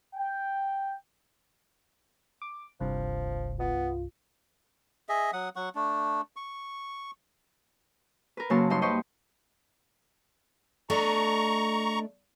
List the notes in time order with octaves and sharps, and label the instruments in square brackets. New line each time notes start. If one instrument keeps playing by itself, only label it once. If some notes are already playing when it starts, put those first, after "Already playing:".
[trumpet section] G5
[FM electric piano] D6
[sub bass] F1 [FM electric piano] C2 G2 [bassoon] F3
[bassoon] B3 [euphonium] F4
[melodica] G#4 D#5 E5
F#3 F#5 D#6
F#3 F#5 C#6
A3 D4
C#6
[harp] A#4 B4
C#3 F#3 A#3 C#5 A5 C6
G2 G3 D#4 C#5 C6
B4 C5 D#5 G5 C6 C#6
[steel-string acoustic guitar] A3 D4 D#5 [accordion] A#5 C#6